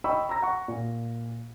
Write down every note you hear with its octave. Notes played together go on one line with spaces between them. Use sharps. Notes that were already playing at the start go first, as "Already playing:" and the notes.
D#5 G5 B5 C#6 E6
A#5 E6 A#6
F#5 C#6
A#2